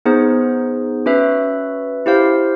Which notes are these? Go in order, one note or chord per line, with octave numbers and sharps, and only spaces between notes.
B3 D#4 G#4 C5
C#4 F#4 B4 E5
E4 G4 C5 F5